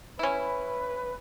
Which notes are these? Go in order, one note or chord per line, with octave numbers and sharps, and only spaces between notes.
C#4 E4 B4